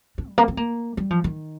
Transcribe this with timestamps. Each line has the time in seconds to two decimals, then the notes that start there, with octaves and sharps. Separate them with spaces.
0.18 D4
0.28 G3
0.38 A#3
0.48 C4
0.57 A#3
0.97 G3
1.10 F3
1.24 D#3